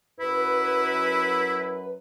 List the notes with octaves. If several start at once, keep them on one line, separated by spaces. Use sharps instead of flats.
F#2 E4 B4